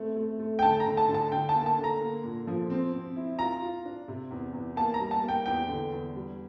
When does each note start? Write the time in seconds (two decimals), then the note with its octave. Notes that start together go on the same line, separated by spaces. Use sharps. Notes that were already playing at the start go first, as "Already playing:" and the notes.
Already playing: A3 C4
0.16 A3
0.39 A3
0.59 G5
0.62 D3 A5
0.80 A#5
0.85 D3
0.97 A5
1.08 D3
1.14 A5
1.32 D3 G5
1.49 A5
1.55 A#3
1.66 A5
1.78 D3
1.84 A#5
2.00 A#3
2.23 A#2
2.47 F3
2.70 C4
2.92 C4
3.16 E4
3.38 F4 A#5
3.61 F4
3.85 D4
4.08 C3
4.31 E2
4.53 E2
4.76 A#3 A5
4.94 A#5
5.00 G3
5.11 A5
5.23 A#3
5.28 G5
5.46 E2 G5
5.68 D3
5.92 E2
6.15 G3